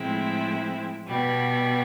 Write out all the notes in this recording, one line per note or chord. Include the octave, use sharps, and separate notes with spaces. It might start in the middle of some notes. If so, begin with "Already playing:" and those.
Already playing: A2 F3 G#3 C4 E4
B2 G3 B3